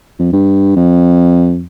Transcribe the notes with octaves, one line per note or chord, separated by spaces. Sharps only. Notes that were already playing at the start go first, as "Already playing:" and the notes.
F2
G2
F2